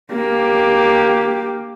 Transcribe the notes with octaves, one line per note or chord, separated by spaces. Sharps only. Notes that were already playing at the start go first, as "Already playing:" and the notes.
A#3 G4